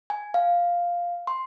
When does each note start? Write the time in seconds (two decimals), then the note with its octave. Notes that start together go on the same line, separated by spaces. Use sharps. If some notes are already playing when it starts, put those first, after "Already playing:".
0.10 G#5
0.34 F5
1.27 C6